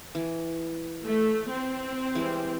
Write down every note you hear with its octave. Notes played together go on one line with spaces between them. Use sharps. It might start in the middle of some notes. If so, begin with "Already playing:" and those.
E3
A3
C4
E3 G3 G#3